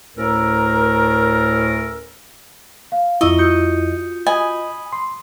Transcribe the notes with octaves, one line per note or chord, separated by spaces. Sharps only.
D2 A2 C#4 A4 A#4
F5
F2 E4 F4 D#5 C#6 E6 G7
F4 F#4 D#6 G6 C#7
D#5 G#5 B5 D#6
C6